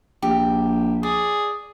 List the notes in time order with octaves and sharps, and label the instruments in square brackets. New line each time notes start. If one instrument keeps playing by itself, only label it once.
[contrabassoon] A#1 [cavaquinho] G4
[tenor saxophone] G#4 [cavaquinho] D5